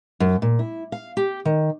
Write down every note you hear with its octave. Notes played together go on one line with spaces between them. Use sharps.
F#2
A#2
E4
F5
G4
D#3